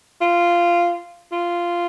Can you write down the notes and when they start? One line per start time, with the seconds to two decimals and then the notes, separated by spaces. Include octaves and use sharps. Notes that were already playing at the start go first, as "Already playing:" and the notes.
0.21 F4
1.32 F4